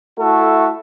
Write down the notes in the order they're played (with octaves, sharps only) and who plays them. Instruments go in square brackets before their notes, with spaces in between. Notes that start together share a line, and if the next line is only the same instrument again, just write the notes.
[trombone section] A3 E4 F#4 A4